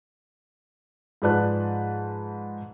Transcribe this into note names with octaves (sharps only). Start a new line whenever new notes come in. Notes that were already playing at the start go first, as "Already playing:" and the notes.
G#2 F3 B4 D5 A5 F#6